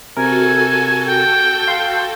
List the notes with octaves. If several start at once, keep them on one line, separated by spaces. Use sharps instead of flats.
C3 F#4 A4 A#4 G#5
G5
F5 C6